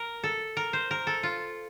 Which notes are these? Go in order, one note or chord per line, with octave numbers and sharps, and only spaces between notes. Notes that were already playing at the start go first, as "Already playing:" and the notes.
Already playing: A#4
A4
A#4
C5
A#4
A4
F4